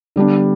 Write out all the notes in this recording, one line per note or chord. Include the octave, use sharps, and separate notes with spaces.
D3 G3 B3 D4